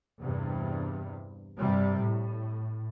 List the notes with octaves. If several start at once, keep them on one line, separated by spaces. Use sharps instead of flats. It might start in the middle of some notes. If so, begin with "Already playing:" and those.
E2 G2 C3
G2 C3 G3
A2